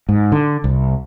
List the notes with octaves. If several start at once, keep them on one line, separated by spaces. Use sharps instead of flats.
G#2
D3
C2